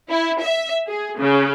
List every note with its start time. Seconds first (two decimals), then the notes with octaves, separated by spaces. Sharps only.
0.10 E4
0.40 E5
0.87 G#4
1.18 C#3